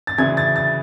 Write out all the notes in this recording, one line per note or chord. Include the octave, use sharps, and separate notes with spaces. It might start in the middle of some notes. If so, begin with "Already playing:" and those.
A6
D2 C#3 E3 G#6
A6
A6